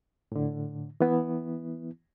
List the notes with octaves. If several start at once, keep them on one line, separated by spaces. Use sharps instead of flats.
A2 D3
E3 B3 E4